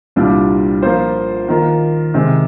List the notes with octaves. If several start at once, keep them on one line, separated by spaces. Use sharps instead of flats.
C2 A#2 G3 D4 F4
F3 A#3 F4 C5
D#3 A#3 F4 A#4
C3 D#3 G#3